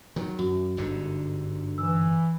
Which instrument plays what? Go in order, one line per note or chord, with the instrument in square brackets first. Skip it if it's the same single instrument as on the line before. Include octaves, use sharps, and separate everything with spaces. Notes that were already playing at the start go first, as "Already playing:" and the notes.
[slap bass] D#3 F#3
[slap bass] F#2 [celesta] F#4
[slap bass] G1 G#2 D3
[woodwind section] E3 [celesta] E6